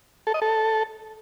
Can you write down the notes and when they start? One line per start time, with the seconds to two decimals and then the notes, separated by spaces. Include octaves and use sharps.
0.27 A4
0.34 D#5
0.42 A4